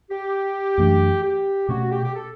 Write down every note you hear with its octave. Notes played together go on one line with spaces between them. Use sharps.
G4
F#2 E3 A3 D4
G4
B2 A3 C#4 F#4
G4
G4
A4